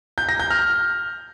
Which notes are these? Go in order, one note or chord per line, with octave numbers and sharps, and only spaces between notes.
G6
A#6
G6
F6